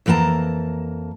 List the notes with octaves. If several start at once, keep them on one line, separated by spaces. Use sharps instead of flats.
F2 E3 A#3 G5 A5 A#5